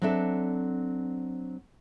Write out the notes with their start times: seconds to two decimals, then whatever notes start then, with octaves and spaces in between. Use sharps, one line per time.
0.02 F#3 C4 D4 A4 E5